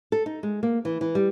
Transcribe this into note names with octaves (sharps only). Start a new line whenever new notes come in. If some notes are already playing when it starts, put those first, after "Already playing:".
A4
D#4
G#3
A#3
E3
E3
G3